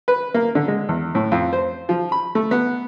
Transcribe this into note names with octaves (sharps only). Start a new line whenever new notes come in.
B4
A#3
D3
G#3
E2
A2
F2
C5
F3
B5
A3
B3